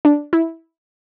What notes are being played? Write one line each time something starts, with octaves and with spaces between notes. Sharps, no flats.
D4
E4